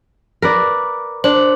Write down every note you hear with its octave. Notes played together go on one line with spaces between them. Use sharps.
A#4 B4 D5
D4 C5